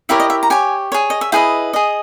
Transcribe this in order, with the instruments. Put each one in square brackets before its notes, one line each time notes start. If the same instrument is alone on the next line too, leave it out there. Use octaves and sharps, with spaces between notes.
[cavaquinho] E4 G4 A#4 C#5 E5
D#5
E5
A#5
G4 C#5 G#5
G#4 C#5
D#5
E5
E4 G#4 B4 D#5 G5
G#4 D#5